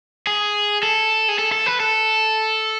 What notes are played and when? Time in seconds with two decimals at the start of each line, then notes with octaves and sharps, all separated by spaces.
0.27 G#4
0.83 A4
1.29 G#4
1.39 A4
1.52 A4
1.66 B4
1.80 A4